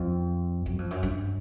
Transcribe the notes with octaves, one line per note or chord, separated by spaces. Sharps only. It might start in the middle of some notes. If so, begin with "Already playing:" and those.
Already playing: F2
F#2
F2
F#2
G2